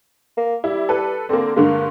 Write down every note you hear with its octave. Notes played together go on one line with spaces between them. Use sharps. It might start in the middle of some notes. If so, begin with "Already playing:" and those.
A#3
G3 E4
A4 B4
D3 A#3 C4
G2 D3 G#3 A#3